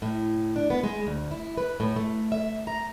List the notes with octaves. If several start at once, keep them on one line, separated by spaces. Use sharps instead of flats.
A2
D4
B3
G#3
D2
E4
B4
A2
A3
E5
A#5